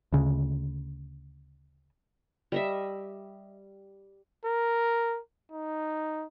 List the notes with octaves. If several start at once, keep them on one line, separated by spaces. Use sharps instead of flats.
D2 C#3
G3 D#5 E5
A#4
D#4